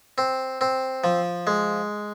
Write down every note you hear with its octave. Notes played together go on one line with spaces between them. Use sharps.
C4
C4
F3
G#3